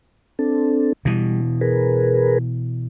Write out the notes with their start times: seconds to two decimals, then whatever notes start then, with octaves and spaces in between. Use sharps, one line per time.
0.39 C4 D4 A4
1.05 B2 E3 G3
1.61 G#4 A#4 B4